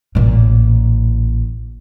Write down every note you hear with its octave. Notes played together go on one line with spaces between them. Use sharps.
A1 A#2